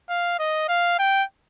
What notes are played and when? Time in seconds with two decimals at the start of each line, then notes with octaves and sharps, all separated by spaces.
0.09 F5
0.39 D#5
0.69 F5
0.99 G5